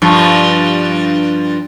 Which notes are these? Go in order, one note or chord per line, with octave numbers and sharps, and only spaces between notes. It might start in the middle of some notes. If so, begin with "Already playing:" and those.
G2 F3